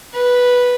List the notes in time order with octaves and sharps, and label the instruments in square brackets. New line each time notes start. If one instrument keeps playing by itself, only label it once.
[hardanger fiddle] B4